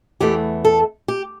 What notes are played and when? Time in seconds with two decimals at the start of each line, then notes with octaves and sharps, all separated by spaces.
0.20 E2 E3 A3 G4
0.65 A4
1.08 G4